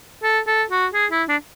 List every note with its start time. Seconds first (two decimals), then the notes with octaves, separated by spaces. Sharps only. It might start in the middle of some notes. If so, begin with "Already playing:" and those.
0.23 A4
0.47 A4
0.70 F#4
0.94 G#4
1.12 E4
1.29 D4